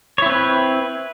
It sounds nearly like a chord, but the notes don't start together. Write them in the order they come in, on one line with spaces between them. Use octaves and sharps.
C#5 E4 C4 B4